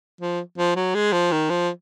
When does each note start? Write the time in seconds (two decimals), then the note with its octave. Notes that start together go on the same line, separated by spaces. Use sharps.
0.21 F3
0.58 F3
0.76 F#3
0.95 G#3
1.12 F3
1.32 D#3
1.50 F3